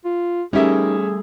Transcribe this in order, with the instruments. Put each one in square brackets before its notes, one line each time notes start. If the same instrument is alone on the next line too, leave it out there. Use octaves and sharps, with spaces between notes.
[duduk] F4
[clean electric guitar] G3 A3 [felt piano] C#4 E5 [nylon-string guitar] D#4 G4 A#4 [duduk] G#4